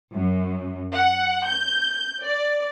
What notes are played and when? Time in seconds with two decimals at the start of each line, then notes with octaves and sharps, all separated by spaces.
0.14 F#2
0.95 F#5
1.46 G6
2.23 D5